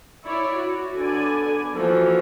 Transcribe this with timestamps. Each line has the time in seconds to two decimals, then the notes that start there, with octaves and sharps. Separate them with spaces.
0.23 E4 C#5 D5
0.54 F#4
0.94 D3 B3 D5 G#5
1.71 E3 F3 A#3 F#4 A4